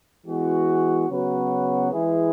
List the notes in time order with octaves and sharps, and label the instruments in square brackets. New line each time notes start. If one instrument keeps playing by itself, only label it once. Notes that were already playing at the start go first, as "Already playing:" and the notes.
[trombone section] E3 G#3 B3 F#4
C#3 F#3 B3 F#4 B4
E3 G#3 E4 G#4 B4